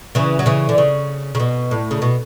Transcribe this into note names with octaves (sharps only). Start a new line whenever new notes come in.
C#3 E3
F#3
C#3 E3
D3
C#3
C#3
B2
A2
C#3
B2